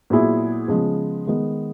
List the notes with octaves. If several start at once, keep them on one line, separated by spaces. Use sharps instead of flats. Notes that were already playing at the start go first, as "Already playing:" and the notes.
A#2 F#3 B3 E4 G#4
C#3 F3 G#3 B3
D#3 G#3 B3